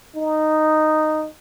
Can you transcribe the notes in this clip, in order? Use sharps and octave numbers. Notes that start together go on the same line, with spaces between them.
D#4